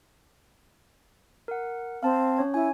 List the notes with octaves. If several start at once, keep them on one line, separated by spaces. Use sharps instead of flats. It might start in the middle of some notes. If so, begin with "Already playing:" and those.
A#4 F#5
C4 F5 A5
C#4 C#5
E4 G#5